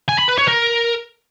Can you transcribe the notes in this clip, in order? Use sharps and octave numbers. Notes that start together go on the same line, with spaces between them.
G#5
B5
B4
C#5
A#4